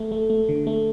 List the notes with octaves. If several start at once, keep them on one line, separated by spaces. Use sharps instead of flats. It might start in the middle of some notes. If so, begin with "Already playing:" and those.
Already playing: A3
A3
A3
D3
A3